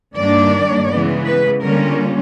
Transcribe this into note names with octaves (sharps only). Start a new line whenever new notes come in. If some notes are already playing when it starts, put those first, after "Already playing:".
G2 D#3 G3 A#3 D4 D5
C#3 E3 G#3 B3
B4
D3 G3 A#3 C#4 F4 A#4